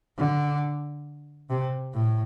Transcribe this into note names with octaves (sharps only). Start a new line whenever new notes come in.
D3
C3
A2